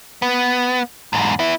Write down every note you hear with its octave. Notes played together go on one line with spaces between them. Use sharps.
B3
E2 G#2
B3 E4